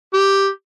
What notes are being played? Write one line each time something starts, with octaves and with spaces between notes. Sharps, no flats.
G4